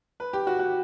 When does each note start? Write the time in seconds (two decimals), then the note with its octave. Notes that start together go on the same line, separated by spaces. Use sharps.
0.20 B4
0.33 G4
0.47 F#4
0.59 F#4